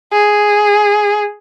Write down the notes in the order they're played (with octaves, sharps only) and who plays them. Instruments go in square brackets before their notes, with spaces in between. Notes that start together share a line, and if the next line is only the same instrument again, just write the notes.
[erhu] G#4